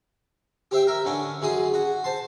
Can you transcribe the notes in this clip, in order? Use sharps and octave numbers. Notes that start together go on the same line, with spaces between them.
G4 C5 E5 G5
A#4 E5
D3 C#4 D4
F#2 C#3 G#4 C6 D#6
F#4
C5 A5 C6